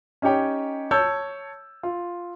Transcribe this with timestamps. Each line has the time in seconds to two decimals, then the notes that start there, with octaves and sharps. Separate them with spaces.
0.22 C#4 D#4 G4 C#5 G5
0.91 C#5 A5 E6 G6
1.83 F4